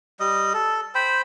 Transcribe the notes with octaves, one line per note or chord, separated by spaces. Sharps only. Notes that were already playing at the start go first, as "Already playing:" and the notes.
G3 D#5
A4
C5 G5 B5